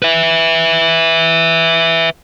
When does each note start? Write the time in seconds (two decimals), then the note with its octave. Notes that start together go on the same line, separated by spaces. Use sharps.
0.02 B4 E5